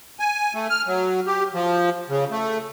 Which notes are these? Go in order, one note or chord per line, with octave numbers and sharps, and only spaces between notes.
G#5
A3
F6
F#3
G4
F3
C#3
A3